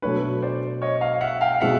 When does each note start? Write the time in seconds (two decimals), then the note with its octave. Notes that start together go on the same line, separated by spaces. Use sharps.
0.02 B2 F#3 A3 D4 B4 C#5
0.42 C5 D5
0.82 C#5 D#5
1.01 D#5 F5
1.21 E5 F#5
1.41 F5 G5
1.60 B2 G#3 C4 E5 F#5